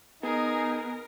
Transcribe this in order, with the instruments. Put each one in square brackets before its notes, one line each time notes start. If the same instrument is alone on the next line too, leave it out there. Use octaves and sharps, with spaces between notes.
[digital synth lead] B3 [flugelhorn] D#4 [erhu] G#4 [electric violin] A#4